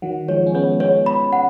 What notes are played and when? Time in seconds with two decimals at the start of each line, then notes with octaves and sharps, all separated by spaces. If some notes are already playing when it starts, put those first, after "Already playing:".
0.02 D#3 F#3 F#5
0.28 F3 G#3 C#5
0.47 C#4
0.54 G#3 B3 C#5
0.80 G#3 B3 C#5
1.06 B5
1.33 F#5